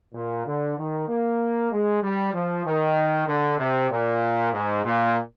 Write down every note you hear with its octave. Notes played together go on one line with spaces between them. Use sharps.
A#2
D3
D#3
A#3
G#3
G3
F3
D#3
D3
C3
A#2
G#2
A#2